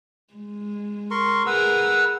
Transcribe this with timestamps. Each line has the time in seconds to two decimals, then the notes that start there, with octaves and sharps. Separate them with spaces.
0.34 G#3
1.11 A#4 C6 C#6
1.47 G#4 A#4 B4 F#5 E6